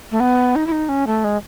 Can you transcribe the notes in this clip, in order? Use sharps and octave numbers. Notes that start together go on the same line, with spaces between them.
A3
B3
D#4
E4
D#4
C#4
A3
G#3